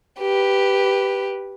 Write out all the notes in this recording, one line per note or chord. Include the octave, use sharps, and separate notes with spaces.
G4 B4